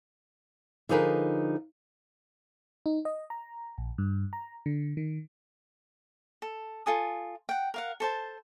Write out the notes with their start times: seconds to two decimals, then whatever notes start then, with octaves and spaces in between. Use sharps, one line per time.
0.89 D3 F3 D#4 G#4 A#4 B4
2.86 D#4
3.05 D#5
3.30 A#5
3.78 A#1
3.98 G2
4.33 A#5
4.66 D3
4.97 D#3
6.42 A4
6.86 F4 A4 G#5 D#6
7.49 F#5 G5
7.74 A#4 F5 F#5
8.00 A4 C5 A5